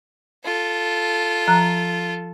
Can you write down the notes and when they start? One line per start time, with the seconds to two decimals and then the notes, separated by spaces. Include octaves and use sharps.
0.44 F4 A4
1.48 F3 A#5 F#6